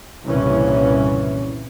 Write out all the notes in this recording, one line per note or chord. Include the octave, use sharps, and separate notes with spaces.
C2 G2 A#2 C#3 E3 C#4